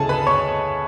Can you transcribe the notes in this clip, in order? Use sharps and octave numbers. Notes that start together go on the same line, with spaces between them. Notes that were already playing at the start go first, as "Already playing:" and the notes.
Already playing: D2 C#3 G#4 A4 G#5 A5
B4 B5
C#5 C#6